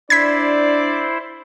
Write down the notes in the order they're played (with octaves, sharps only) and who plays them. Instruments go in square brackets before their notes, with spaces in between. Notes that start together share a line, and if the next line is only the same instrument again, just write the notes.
[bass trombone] D4 [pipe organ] E4 C5 [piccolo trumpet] D5 [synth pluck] G#6 B6